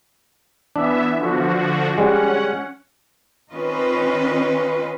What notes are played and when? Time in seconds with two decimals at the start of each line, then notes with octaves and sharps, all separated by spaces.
0.76 E3 B3 D4 E5
1.18 D3 F3 F#4
1.98 G3 G#3 C#4 F#5
3.52 D#3 C4 C#4 F4 B4 D#5